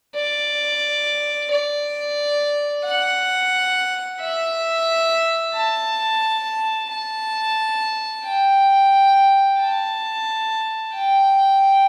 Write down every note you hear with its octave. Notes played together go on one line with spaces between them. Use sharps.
D5
D5
F#5
E5
A5
A5
G5
A5
G5